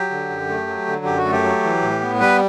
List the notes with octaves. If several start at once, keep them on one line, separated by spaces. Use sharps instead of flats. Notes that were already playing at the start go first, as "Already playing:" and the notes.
Already playing: F#3 G4
D3
F#2
A3
F#3
D3
F#2 G4
F#4
A3
G4
F#3
E3
A2
B3
G3 B4